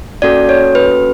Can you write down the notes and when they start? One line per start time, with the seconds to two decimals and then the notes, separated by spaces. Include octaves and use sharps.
0.22 A#3 C#4 F#4 A4 D5
0.49 C#5
0.75 B4